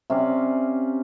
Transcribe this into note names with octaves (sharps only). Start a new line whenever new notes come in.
C3 C#4 D5 F5